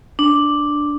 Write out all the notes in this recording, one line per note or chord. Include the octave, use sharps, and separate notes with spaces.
D4